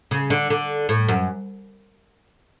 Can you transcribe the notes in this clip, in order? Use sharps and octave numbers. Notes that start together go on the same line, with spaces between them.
C#3
D3
D3
A2
F#2